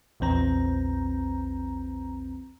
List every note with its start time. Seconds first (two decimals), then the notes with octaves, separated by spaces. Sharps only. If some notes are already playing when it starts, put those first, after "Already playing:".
0.20 A#1 E2 C4 A#5